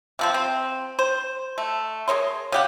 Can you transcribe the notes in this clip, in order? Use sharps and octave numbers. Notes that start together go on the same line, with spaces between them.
C3 F3 C4
C4
C5
A3
G#4 A#4 C#5 C6
C#3 G4 F#5